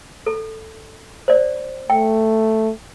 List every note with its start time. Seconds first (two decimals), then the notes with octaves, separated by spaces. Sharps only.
0.26 A4
1.28 C5 D5
1.90 A3 G5